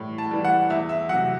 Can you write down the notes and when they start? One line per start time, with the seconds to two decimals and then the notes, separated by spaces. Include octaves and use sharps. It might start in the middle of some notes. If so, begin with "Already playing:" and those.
Already playing: A2 E3 G3
0.18 A5
0.31 E3 G3
0.44 F#5
0.70 E2 E5
0.89 E5
1.09 F#3 F#5
1.14 C3